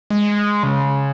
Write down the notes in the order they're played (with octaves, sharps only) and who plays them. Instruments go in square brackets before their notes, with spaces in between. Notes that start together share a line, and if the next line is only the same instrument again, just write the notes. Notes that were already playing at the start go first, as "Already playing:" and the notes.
[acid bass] G#3
C#3